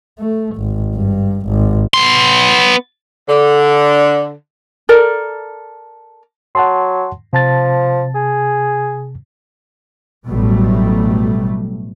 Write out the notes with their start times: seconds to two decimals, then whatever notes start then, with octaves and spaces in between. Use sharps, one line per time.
0.19 A3
0.57 G#1
0.95 G2
1.48 G#1
1.94 B3 C6
3.28 D3
4.89 A4 A#4 D5
6.55 F#3 F#5 A5 C6
7.33 C3 F3 A5 A6
8.15 G#4
10.28 A1 B2 F#3 G3 A3